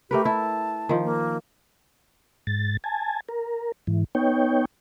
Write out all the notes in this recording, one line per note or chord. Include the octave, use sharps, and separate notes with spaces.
A3 G4 A#4 B4
E4 A5
D#3 F3
A#3
G#2 A6
G#5 A5
A#4
G#2 E3
B3 D#4 C#5 G5